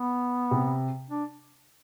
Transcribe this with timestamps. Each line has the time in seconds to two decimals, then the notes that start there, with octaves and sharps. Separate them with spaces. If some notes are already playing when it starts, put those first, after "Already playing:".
Already playing: B3
0.51 C3
1.10 D4